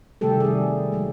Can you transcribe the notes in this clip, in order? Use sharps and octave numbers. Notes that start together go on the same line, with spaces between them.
C3 D#3 G3 A3 G4 A4
G3 G#4
F#3 G#3 A#3